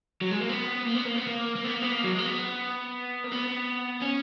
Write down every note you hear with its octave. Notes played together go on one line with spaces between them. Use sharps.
F#3
G#3
A#3
B3
A#3
B3
A#3
B3
A#3
A#3
B3
A#3
B3
A#3
F#3
G#3
A#3
B3
A#3
B3
C#4